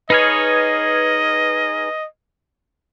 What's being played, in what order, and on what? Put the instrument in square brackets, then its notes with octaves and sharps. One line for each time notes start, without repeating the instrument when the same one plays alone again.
[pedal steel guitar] D#4 G#4 C#5 [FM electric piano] B4 F6 G#6 [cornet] D#5